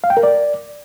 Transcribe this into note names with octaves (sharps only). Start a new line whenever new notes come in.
F5
G5
A#4
D5